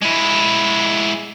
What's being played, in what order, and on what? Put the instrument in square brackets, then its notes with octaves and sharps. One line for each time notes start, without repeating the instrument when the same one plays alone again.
[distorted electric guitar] G#3 E4